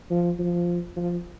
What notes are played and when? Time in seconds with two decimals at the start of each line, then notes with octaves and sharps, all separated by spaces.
0.11 F3
0.39 F3
0.96 F3